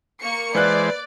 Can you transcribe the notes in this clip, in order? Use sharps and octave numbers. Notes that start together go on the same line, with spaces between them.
A#3 C#6 C#7
E3 G#3 B4 C5 D5 F#6